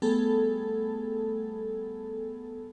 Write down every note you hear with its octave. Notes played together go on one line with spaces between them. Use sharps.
G3 A3 B3 G#4 A4